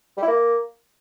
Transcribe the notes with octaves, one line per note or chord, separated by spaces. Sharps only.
G3
E4
A#3